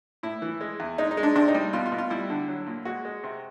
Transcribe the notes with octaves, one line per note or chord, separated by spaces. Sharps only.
A2 E4
E3
G#3
E2
G#3 D#4
D#4
G#3
D4
C3 D4
D#4
G3
B2 F4
F4
B2
F4
G3 E4
D3
F#3
A#2
G#3 F#4
G#3
C3